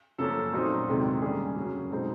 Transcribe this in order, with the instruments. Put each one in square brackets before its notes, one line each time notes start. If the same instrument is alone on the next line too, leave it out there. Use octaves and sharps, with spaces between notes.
[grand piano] F#2 C#3 F3 A#3 C#4 A4
A#2 F#3 A3 C4 D#4
E2 C3 D#3 G#3
D3 G3 A#3 C#4 G#4
F#2 C#3 F#3
B2 G#3 C4 D#4